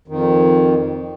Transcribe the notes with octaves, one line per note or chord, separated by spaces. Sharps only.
F2 D#3